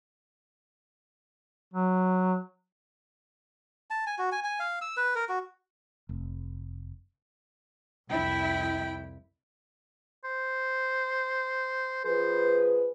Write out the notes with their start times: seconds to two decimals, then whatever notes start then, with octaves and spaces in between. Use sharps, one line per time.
1.74 F#3
3.90 A5
4.07 G#5
4.18 F#4
4.32 G#5
4.44 G#5
4.60 F5
4.81 E6
4.97 B4
5.15 A#4
5.29 F#4
6.09 F1
8.10 C2 F2 E4 G5
10.24 C5
12.05 F3 G#4 B4 C5